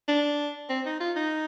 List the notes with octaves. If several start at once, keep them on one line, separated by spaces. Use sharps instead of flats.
D4
C4
D#4
F4
D#4